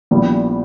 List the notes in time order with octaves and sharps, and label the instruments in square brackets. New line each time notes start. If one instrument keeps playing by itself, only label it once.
[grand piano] A#1 A#2 G3 B3 E4